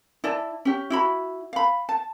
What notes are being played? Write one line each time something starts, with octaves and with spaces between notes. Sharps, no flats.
E4 D5 A5
C#4 G4
E4 F#4 B5
F5 B5
A5